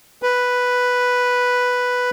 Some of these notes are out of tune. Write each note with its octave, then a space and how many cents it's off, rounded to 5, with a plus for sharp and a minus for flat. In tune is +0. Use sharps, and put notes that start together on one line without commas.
B4 +0